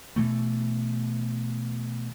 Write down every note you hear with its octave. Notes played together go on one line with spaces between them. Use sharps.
B2 E3 A3